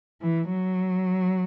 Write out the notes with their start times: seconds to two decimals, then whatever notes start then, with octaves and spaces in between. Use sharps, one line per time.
0.22 E3
0.50 F#3